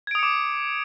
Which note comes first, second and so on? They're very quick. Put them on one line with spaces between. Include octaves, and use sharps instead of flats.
G#6 D7 D#6 C#7 D6